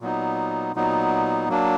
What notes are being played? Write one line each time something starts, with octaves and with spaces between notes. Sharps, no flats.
A#2 F#3 B3 D#4
A#2 F#3 B3 D#4
F#3 A#3 D4